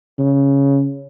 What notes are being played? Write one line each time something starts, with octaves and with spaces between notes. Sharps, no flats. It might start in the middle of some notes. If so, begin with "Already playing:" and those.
C#3